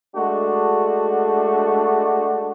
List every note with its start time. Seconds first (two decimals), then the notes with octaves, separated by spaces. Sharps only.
0.16 G#3 A3 D4 F#4